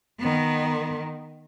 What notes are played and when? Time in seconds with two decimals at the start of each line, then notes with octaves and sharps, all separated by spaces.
0.19 D#3 B3